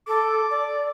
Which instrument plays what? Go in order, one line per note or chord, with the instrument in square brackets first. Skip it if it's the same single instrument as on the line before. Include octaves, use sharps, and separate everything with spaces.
[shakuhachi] A4 [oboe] D6
[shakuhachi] D5